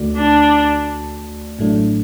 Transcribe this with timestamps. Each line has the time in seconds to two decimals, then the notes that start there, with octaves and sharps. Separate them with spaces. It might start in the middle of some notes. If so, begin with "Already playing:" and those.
Already playing: D2 D3 A3 F#4 D5
0.17 D4
1.58 A1 A2 F#3 A3 D4